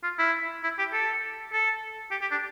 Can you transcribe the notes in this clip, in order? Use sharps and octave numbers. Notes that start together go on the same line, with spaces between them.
F4
E4
E4
G4
A4
A4
G4
G4
D4